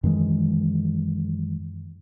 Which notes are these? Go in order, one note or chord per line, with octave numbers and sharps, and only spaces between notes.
F#2 D#3 E3 G#3